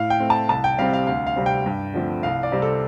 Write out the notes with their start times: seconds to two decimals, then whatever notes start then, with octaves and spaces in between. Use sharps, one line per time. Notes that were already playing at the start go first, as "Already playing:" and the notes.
Already playing: A2 F5
0.10 G5
0.20 A3 C4
0.30 A5
0.49 C2 A5
0.64 G5
0.78 C3 G3 C4 F5
0.93 F5
1.07 D2 F5
1.27 F5
1.36 C3 G3 C4
1.46 G5
1.66 G2
1.94 D3 F3 A3 C4
2.23 C2 F5
2.43 D5
2.52 C3 G3 C4
2.62 A4